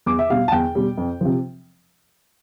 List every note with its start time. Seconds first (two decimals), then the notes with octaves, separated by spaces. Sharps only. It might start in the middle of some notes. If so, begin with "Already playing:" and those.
0.06 E2 D6
0.19 E5
0.30 B2 G3 F5
0.48 A5
0.52 E2 G5
0.75 B2 G3
0.97 F2
1.21 C3 F3